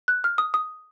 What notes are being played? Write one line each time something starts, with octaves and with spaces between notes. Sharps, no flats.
F#6
F6
D#6
D#6